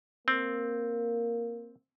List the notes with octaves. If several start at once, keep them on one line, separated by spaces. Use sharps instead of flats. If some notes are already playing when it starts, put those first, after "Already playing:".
A#3 C4